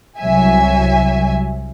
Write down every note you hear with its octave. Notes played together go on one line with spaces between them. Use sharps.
C2 F#3 E5 G#5